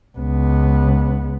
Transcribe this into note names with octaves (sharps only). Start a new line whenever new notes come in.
C#2 B3